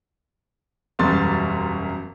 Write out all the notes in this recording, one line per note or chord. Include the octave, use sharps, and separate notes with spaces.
E1 F#2 G3 C6 A6